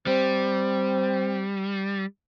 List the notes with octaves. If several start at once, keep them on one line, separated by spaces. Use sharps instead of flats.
G3 C4